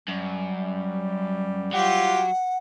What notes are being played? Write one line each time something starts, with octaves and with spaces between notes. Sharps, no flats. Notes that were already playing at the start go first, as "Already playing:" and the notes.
F#2 G3
F#3 F4 G4 F#5 G5